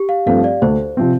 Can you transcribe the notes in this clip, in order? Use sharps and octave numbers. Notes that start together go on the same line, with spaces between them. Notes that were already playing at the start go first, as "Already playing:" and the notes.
Already playing: G4
F5
G2 F3 A3 C4 F5
D5
D2 C5
C3 F3 C4